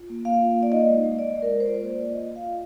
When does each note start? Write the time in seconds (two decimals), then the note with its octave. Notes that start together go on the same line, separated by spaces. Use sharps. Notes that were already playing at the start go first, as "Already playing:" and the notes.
Already playing: F4
0.10 A#3
0.25 A#3 F5
0.41 F4
0.57 A#3
0.63 D5
0.72 D#4 D#5
0.88 G#3
1.03 G#3
1.19 G#3 D5
1.35 G#3
1.42 A#4
1.50 G#3
1.60 C5
1.66 F4 D5
1.81 A#3
1.97 F4
2.12 F4 D#5
2.29 F4
2.36 F5
2.44 F4